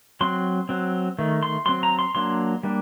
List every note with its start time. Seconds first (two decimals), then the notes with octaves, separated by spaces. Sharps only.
0.21 F#3 C4 C6
0.69 F#3 C4
1.19 D#3 A3
1.43 C6
1.66 F#3 C4 C6
1.83 A#5
1.99 C6
2.15 F#3 A#3 D4 C6
2.63 G3 A#3 D4